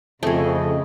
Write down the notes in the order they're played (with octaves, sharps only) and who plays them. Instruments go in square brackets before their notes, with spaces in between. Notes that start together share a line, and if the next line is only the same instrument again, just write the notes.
[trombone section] F2 [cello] C#3 [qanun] A3 G#4 [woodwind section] D#5